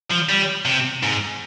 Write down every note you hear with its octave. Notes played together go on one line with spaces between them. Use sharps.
F3
G3
C3
G#2